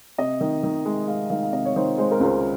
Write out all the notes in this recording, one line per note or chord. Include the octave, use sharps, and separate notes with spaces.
C3 D#5
D#3
D#3
G#3
G#3 F5
D#3 F5
F5
C3 D#5
C#5
D#3 C5
G#3 C5
A#4
C#2 C5